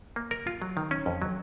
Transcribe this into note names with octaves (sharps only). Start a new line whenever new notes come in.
A#3
A#4
F4
F#3
D#3
C#4
F2
F#3